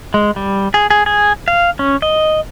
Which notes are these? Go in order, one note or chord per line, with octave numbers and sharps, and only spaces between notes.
G#3
G3
G#4
G#4
G#4
F5
C#4
D#5